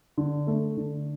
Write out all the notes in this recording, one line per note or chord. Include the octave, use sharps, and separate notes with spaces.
D3
A3
D3